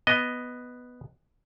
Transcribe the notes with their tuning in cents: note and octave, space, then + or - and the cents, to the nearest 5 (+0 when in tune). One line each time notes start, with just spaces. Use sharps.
B3 +0 D#5 +5